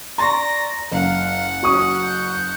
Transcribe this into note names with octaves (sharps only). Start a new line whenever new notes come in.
D5 A#5 C6 C#6 A#6
F#1 F5 F#5
C#4 F#4 C#6 D#6
G6